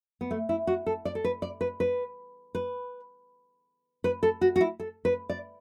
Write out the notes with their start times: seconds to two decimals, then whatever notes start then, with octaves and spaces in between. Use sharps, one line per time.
0.21 B3
0.31 A3
0.49 E4
0.67 F#4
0.87 A4
1.05 D5
1.15 A4
1.24 B4
1.42 D5
1.61 B4
1.80 B4
2.55 B4
4.04 B4
4.23 A4
4.41 F#4
4.56 F#4
4.61 E4
4.80 A4
5.05 B4
5.30 D5